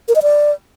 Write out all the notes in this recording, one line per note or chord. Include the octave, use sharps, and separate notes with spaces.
A#4
D#5
D5